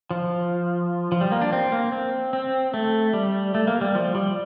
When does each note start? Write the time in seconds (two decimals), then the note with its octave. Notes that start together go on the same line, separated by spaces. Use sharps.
0.11 F3
1.12 F3
1.21 G3
1.32 A#3
1.41 D4
1.52 C4
1.72 A#3
1.92 C4
2.33 C4
2.74 A3
3.13 G3
3.55 A3
3.67 A#3
3.81 G3
3.95 F3
4.15 G3